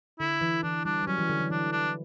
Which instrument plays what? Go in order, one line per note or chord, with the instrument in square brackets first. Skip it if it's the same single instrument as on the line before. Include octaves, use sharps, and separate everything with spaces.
[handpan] D3 [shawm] E4
[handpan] E3
[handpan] E3 [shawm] D4
[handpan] G3 [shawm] D4
[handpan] G3
[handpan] F#3 [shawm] C#4
[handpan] E3
D3
E3
[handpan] E3 [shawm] D4
[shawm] D4